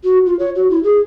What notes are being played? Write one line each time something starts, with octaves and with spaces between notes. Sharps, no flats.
F#4
F4
C#5
F#4
E4
G#4